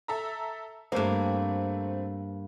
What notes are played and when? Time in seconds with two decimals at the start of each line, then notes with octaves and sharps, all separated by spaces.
0.08 A4 E5 A#5
0.92 G2 A3 A#3 C4